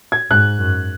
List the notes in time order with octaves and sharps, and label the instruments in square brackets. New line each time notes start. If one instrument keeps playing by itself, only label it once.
[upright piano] G#6
[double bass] G#2 [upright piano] F#6
[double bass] F#2